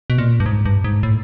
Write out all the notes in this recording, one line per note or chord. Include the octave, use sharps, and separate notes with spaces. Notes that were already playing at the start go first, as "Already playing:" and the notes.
B2
A#2
G2
G#2
G2
G#2
A2